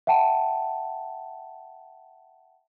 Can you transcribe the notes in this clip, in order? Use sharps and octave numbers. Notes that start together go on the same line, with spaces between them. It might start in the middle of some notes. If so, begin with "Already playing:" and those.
E5 F#5 G5 A5